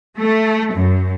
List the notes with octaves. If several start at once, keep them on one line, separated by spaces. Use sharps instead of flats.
A3
F#2